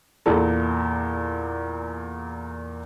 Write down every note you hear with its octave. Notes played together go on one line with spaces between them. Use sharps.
E2 A#2 A4